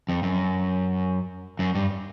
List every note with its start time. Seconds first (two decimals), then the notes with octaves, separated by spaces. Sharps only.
0.09 F2
0.23 F#2
1.59 F#2
1.75 G2